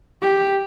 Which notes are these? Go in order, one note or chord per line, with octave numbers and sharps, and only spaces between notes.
G4